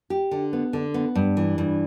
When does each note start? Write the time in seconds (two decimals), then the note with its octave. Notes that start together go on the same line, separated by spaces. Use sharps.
0.10 G4
0.31 D3
0.53 B3
0.73 D3
0.94 B3
1.15 G2
1.37 E3
1.58 G2